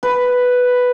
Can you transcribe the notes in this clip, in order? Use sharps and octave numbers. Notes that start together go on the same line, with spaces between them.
B4